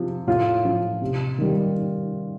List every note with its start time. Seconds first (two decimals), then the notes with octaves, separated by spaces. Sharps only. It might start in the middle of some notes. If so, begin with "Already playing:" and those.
Already playing: C3 F3
0.27 A2 F4
0.65 F3
1.01 C3
1.38 D#3 G3